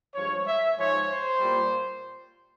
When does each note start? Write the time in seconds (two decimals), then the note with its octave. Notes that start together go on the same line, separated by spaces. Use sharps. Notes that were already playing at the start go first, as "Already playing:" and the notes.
0.14 G2 F3 G#3 C#5
0.46 E5
0.77 G#2 F3 G#3 C#5
1.09 C5
1.40 A#2 G3